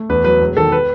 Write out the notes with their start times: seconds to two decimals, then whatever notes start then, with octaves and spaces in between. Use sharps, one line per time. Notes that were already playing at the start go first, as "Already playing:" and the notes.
Already playing: A3
0.09 E2 B4
0.25 F#3 B4
0.41 E1
0.57 D#3 A4
0.72 B4